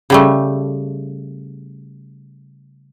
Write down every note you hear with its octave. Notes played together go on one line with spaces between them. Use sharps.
C#3 G3 A3